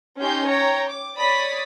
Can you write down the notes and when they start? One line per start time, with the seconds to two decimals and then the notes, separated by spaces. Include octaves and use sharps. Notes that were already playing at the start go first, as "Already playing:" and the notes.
0.18 C#4 D#4 G4 C6 G6
0.46 C#5 G5 A#5
0.86 D6
1.17 C#5 D5 B5 D#6 B6